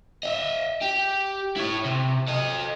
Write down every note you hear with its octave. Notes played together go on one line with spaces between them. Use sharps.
D#5 E5
G4
E4 C#5
C3
A4 D#5